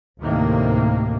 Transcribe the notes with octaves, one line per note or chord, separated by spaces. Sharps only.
D2 A2 C3 D#3 A#3